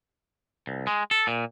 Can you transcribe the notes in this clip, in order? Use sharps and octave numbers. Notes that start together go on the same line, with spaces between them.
C2
G#3
A4
A#2